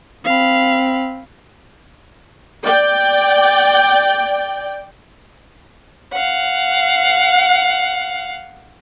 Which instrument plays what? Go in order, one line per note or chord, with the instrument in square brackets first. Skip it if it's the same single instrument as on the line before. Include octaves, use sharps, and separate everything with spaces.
[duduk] C4 [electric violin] F5 B5
[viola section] D5 G5
[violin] F5 F#5